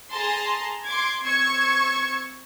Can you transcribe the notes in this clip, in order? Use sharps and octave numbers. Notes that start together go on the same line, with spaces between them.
G#4 A5 A#5 C6
C6 D6 G#6
C4 C#6 E6 G#6